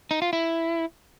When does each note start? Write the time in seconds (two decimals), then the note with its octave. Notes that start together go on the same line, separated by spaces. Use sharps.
0.11 D#4
0.22 F4
0.33 E4